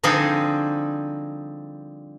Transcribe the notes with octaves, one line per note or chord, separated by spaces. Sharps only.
D3 F3 G3 C4 D#4 G#4